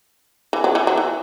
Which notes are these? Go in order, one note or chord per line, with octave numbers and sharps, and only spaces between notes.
E3
F#3
E3
F#3
E3